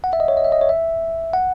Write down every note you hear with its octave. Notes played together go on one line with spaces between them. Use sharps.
F#5
E5
D#5
C#5
D#5
E5
D#5
C#5
E5
F#5